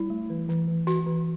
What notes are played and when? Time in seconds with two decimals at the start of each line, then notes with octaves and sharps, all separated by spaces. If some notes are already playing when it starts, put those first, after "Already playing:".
Already playing: G3 E4
0.10 A3
0.30 E3
0.49 E3
0.68 E3
0.87 E3 F#4
1.06 E3